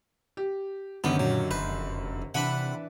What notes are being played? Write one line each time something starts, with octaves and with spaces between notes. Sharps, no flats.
G4
F#2 D3 D#3 B3 G4 C#5
A#2 F#3
F1 B4 C5
C3 E3 D4 B4 F#5 B5